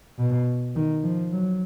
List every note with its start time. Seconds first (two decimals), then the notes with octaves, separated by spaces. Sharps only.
0.19 B2
0.76 D#3
1.04 F3
1.32 F#3